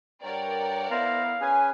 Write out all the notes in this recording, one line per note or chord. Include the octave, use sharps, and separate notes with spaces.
G2 A#4 C#5 D5 F#5 G5
B3 E4 C5 F5 A#5
C#4 G#4 B4 G#5